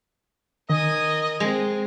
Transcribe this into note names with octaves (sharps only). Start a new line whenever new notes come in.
D#3 A#4 D#5 G#5
G#3 C4